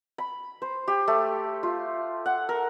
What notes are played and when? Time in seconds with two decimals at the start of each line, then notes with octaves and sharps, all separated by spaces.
0.18 B5
0.62 C5
0.88 G4
1.08 A3
1.63 F4
2.26 F#5
2.49 A#4